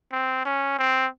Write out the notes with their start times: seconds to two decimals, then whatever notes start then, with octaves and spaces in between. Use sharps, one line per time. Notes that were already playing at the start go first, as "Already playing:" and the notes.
0.12 C4
0.45 C#4
0.79 C4